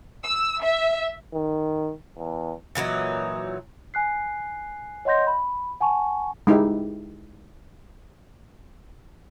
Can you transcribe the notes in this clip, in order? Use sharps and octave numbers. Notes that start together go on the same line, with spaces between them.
E6
E5
D#3
E2
A#2 E3 F#3 D#4
G#5 F#6 C7
C#5 D#5 F#5 C6 G6 A#6
B5
F#5 G#5 A5 C#6
G#3 D#4 E4 G4